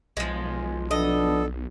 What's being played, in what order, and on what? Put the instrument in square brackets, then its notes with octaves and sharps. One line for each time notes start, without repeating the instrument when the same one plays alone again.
[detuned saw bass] B1 [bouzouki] F3 G#3
[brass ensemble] F3 B3 D4 [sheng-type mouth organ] A4 [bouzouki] D#5